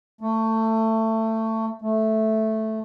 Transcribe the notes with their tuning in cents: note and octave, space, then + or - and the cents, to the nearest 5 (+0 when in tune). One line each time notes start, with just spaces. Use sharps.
A3 +20
A3 -5